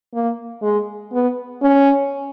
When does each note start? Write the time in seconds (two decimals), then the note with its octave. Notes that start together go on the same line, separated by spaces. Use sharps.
0.14 A#3
0.62 G#3
1.12 B3
1.62 C#4